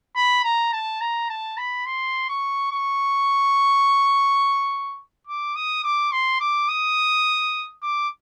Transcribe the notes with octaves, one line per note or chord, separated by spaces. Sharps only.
B5
A#5
A5
A#5
A5
B5
C6
C#6
C#6
D6
D#6
D6
C6
D6
D#6
D6